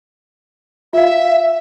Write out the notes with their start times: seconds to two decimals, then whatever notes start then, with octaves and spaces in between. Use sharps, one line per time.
0.93 F4 E5 F5